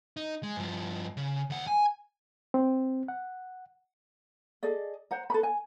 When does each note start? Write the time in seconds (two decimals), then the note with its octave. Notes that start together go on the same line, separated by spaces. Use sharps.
0.17 D#4
0.43 G#3
0.56 G2 F3
1.17 C#3
1.50 D#2 F#5
1.67 G#5
2.54 C4
3.08 F#5
4.63 G#4 A4 D5 D#5
5.11 C5 F#5 A#5
5.30 A4 B4 B5
5.43 G#5